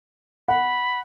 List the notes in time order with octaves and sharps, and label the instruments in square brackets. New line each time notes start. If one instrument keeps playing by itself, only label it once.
[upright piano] F#5 [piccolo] B5